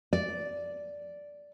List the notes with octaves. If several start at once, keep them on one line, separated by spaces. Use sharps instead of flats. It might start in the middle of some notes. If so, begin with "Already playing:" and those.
D5